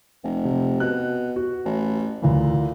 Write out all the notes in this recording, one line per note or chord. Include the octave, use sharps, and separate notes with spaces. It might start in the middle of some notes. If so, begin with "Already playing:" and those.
F1
C3
B2 F#6
F#4
A1
D2 A#2 E3